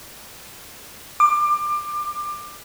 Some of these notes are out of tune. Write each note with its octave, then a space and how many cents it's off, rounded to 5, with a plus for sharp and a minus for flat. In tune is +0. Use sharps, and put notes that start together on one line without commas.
D6 +25